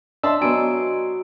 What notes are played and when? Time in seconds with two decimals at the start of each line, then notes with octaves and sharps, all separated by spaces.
0.23 D4 D#5 E5 A5 C6 E6
0.41 F#3 B3 D4 G#5 D7